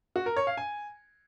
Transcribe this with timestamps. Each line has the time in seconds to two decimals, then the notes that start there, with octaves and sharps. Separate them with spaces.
0.16 F#4
0.26 A#4
0.37 C#5
0.47 F5
0.57 G#5